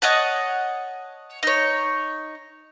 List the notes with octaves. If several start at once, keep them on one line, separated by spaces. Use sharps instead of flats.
C#5 D#5 F#5 A5
D#4 C#5